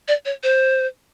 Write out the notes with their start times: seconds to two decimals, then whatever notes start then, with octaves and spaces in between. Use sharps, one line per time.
0.08 D5
0.25 C#5
0.43 C5